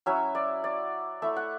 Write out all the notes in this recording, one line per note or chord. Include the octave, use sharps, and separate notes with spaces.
F#3 C#4 E4 E5
D5
D5
A3 E4 E5
F#5